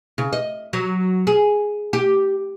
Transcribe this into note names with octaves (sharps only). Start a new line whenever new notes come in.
C#3
D#5
F#3
G#4
G4